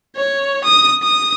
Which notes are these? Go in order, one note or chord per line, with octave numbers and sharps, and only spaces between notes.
C#5
D#6
D#6